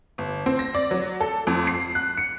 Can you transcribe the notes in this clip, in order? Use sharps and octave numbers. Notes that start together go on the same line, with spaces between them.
G1
C4
A#6
D5
F#3
A4
F2
C7
F#6
C#7